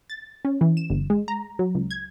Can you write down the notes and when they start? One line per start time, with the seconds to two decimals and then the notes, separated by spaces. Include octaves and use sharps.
0.10 A6
0.45 C#4
0.61 E3
0.77 E7
0.90 G1
1.10 G#3
1.28 A#5
1.59 F#3
1.75 C#2
1.91 G#6